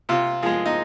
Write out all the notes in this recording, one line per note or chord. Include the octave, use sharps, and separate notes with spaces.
C3 F4
F3 G#3 G#4
D#4